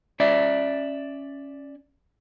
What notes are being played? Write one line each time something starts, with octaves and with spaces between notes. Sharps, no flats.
C#4 D5 E5